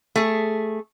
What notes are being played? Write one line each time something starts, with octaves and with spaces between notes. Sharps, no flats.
A3 G#4